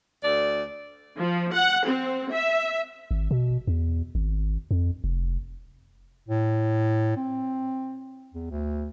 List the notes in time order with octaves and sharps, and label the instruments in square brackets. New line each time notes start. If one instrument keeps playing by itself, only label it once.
[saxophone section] D2 D5
[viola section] F3
F#5
C4
E5
[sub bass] G#1
B2
E2
G#1
F2
F1
[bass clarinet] A2
C4
E2
D2